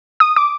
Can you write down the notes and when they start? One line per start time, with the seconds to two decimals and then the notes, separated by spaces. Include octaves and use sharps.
0.20 D#6
0.36 D6